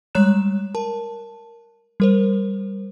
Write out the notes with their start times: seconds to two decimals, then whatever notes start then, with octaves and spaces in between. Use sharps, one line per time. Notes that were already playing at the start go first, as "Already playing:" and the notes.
0.15 G3 G#3 C#5 A#5 F#6 E7
0.75 A#4 A5
2.00 G3 A#4 C5